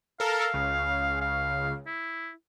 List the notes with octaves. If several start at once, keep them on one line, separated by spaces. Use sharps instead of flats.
A4 A#4 F5
C#2 C#3
F5
E4